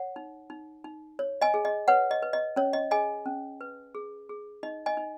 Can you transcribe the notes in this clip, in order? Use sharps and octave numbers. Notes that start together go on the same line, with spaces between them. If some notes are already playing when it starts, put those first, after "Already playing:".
Already playing: C#5 F#5
D#4
D#4
D#4
C#5
D#5 G#5
G#4
D#5
B4 C#5 F#5
D#5
B4
D#5
C#4 C#5
D#5
G#4 D#5 G#5
C#4
B4
G#4
G#4
D#4 D#5
D#5 G#5
D#4